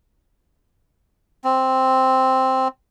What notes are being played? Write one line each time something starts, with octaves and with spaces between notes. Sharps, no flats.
C4